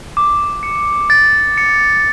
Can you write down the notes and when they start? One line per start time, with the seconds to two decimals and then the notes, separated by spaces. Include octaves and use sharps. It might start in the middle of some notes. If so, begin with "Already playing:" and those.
0.17 D6
0.63 C#7
1.10 A6
1.57 C#7